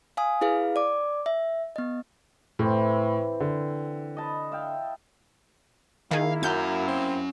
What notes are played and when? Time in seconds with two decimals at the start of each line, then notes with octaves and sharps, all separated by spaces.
0.17 F5 G#5 D#6
0.41 E4 G#4 B4 F5
0.76 D5 D6
1.26 E5
1.76 B3 D#5
2.59 A2 E3 C4
3.40 D3
4.17 D#5 A5 B5
4.52 E5 F5 G5
6.11 D#3 A#3 E4 G#4 F5
6.43 F#2 C#4 F#5 G6
6.88 C4